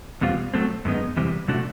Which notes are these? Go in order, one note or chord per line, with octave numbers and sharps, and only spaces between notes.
E2 B2 G3 C4 F4
F#3 A3 C4
F#2 D#3 G#3 B3 D#4
E2 C3 E3 G3 C4
C3 F3 A3 D4 F#4